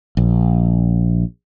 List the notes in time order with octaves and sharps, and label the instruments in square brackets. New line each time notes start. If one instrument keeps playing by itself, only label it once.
[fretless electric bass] A#1